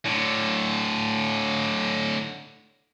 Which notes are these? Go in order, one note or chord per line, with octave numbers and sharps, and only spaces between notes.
A2 D3